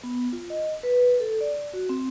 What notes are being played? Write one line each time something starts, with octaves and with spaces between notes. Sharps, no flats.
B3
F4
D#5
B4
A4
D5
F#4
C4